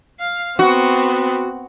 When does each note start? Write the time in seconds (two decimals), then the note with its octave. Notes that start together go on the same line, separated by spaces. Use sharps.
0.20 F5
0.59 B3 C4 F#4